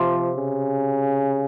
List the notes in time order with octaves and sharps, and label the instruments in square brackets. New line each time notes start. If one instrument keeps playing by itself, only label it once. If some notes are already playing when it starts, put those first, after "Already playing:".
Already playing: [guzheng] C3 C4 [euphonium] F3
[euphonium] C#3